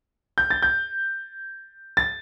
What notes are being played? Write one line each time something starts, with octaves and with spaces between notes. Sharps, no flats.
G6
A6
G6
A6